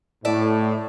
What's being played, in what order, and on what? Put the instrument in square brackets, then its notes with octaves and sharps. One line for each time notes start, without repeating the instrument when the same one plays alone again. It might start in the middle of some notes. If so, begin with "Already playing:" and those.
[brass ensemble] A2 [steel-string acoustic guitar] D5 E5 A5